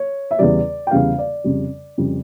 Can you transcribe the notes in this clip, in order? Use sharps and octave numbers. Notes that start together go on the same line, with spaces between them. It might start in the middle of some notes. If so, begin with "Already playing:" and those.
Already playing: C#5
E5
E2 C#3 G3 D5
G5
E2 C#3 G3 F5
D5
F2 C#3 G3
F2 C#3 G3